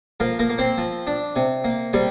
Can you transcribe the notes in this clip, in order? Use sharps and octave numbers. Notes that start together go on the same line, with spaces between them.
F3 A#3 A#4
A#3 A#4
A#3
C4 C5
F3
D4
C3
A#3
C3 G3 G4